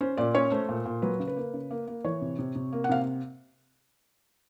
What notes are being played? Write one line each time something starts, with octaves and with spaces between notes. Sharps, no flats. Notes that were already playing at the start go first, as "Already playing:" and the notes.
C#4 C5
A#2 D5
C#4 C#5
A3 C5
A#2
A#2
F#3 B4
C#3
B4
A#3
C#3
A#3
A#3
E3 C#5
C3
C3
C3
A#3
F#5
C3 F5